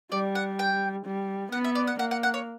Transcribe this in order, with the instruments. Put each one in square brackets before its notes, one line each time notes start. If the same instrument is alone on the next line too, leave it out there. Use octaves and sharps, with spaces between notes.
[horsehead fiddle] G3 [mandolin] D5
[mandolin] F#5
G5
[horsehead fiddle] G3
[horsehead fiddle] B3 [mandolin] F#5
[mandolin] E5
D5
F#5
[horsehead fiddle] A#3 [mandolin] F#5
[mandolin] F#5
F#5
C#5